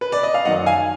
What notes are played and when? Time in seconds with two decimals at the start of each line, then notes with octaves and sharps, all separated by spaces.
0.01 B4
0.12 D5
0.23 D#5
0.34 F5
0.45 F#2 D#3 D#5 F#5
0.66 F5 G#5